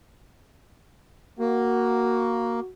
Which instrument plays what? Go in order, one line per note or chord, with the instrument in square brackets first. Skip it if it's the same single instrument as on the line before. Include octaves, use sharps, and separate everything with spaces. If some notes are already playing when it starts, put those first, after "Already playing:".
[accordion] A#3 [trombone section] F#4